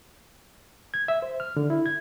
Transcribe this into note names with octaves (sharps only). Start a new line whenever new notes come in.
G#6
E5
C5
F6
D3
E4
G#6